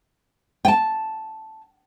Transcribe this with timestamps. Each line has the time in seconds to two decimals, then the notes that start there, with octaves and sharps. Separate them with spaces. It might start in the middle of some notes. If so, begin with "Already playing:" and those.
0.65 G5 A5